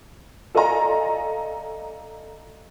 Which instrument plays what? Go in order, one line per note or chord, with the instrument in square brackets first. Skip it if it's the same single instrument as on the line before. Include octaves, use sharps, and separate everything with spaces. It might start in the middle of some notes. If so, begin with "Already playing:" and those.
[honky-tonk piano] A4 D5 D#5 F5 G#5 A#5